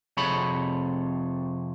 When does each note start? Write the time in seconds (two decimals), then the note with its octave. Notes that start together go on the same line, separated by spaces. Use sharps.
0.17 F2 C3 G#4 A4 C#5 B5